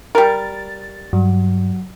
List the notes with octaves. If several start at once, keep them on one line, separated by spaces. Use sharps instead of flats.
G3 A#4 A6
G2 F#3